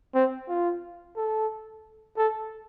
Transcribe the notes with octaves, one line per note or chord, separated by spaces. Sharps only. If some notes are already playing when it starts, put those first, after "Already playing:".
C4
F4
A4
A4